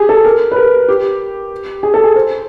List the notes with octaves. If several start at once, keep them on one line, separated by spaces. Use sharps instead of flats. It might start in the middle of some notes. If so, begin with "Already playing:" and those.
Already playing: G4 G#4
A4
A#4
B4
A#4
G4
G#4
A4
G#4
C5